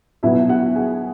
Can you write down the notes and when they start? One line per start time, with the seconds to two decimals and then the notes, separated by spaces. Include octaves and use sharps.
0.23 B2 F#3 B3 E4 E5
0.49 F#4 F#5
0.75 G#4 G#5